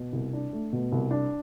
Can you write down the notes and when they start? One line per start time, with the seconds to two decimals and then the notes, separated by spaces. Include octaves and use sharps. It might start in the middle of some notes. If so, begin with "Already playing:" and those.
Already playing: B2
0.13 C2
0.33 D4
0.53 A3
0.73 B2
0.92 C2
1.11 D4